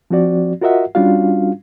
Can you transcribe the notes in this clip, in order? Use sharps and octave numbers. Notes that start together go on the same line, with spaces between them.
F3 C4 F#4 D5
F4 F#4 A#4 D#5 E5 F#5
G3 C#4 D4 F4 F#4 F5